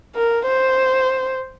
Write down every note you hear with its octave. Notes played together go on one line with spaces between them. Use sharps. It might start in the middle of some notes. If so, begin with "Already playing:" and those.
A#4
C5